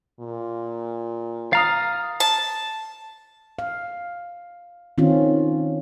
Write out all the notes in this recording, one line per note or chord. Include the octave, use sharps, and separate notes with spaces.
A#2
F5 A#5 D#6 F6 A6
A5
F5
D#3 C4 C#4 F4